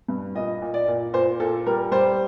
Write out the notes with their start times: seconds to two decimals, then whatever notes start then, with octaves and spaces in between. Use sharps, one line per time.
0.08 G2
0.35 A#2 D#5
0.62 A#2
0.74 D5
0.88 A#2
1.13 A#2 C5
1.40 A#2 A4
1.67 G3 A#4
1.92 G3 C5